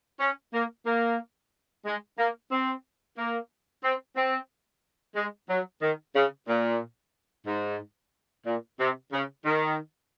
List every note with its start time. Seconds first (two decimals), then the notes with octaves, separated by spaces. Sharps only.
0.20 C#4
0.53 A#3
0.86 A#3
1.85 G#3
2.18 A#3
2.52 C4
3.17 A#3
3.83 C4
4.16 C4
5.16 G#3
5.49 F#3
5.82 D#3
6.15 C#3
6.48 A#2
7.47 G#2
8.46 A#2
8.79 C3
9.12 C#3
9.45 D#3